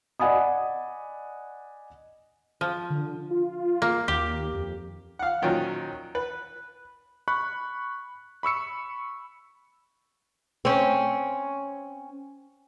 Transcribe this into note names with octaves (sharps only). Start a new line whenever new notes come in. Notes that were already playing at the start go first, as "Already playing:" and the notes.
D5 D#5 F#5 G#5 B5 D#6
F3
D3
F4
A#3
D#2 G4
F2
F5 F#5
A#2 D#3 F3 F#3 C#4
B4
B5 C#6 F#6
B5 C#6 E6 C#7
C4 C#4